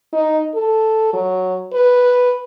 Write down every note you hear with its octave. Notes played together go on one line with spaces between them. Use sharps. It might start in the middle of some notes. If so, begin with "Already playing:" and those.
D#4
A4
F#3
B4